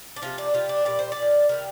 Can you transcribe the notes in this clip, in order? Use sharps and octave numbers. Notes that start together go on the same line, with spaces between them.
D4
C3 F3 F4
D4
C3 G3 F4
D4
A#2 G3 D5
C5
A#2 D5
F3
C3 G3 A#4